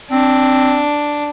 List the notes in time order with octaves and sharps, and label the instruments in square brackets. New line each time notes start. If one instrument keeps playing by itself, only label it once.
[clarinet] C4 [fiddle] D4